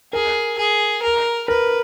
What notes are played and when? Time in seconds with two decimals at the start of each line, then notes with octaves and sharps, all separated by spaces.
0.13 G#4 A#4
0.58 G#4
1.02 A#4
1.48 A#4 B4